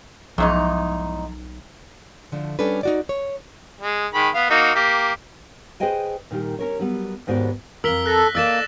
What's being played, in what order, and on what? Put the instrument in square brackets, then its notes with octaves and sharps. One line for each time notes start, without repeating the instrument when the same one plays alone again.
[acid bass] B1 [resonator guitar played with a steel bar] E2 G#2 D#4 [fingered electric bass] F3
[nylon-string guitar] D3 F3 A3
G3 C#4 D4 A4 B4
D#4 F#4 D5
C#5
[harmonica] G#3
D#3 G#3 B5
B3 F5
A#3 D#4 F#4
A#3 G4
[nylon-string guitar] G#4 B4 C5 D#5 G5 G#5
A#2 D#3 G3 G4
C#4 A#4 C#5
F#3 G3 B3
D#2 G#2 B3 F#4 G4 D5
[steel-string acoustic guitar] F2 A#4 [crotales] E6 B6 G7
[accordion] A4 [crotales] F#6 A#6
[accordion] A#3 [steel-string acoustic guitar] A4 D5 D#5 [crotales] E6 A6 E7